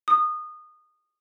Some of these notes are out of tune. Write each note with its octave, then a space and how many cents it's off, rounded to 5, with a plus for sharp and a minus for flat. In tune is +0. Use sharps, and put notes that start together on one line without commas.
D#6 -25